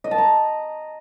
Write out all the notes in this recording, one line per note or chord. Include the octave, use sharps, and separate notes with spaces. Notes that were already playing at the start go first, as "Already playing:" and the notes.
D#5
A5
A#5